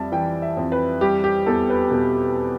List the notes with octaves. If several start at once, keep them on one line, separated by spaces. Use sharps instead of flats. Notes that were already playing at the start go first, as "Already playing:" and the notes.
Already playing: F2 G3 D5 E5 A5
E3 G5
E5
F2
B4
G3 G4
G4
E2 A4
B4
B2 A4